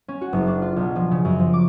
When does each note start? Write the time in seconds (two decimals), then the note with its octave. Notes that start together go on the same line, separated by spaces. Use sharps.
0.08 C#4
0.21 F#4
0.33 F#1
0.47 D4
0.62 F4
0.76 B1
0.96 F3
1.11 C#3
1.25 F#2
1.39 F3
1.53 D6